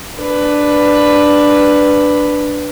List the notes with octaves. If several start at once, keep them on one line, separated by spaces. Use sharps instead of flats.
D4 B4